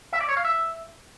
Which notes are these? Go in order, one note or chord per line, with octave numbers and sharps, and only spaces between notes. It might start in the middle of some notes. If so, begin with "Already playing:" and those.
E5
D5
C#5
F5
E5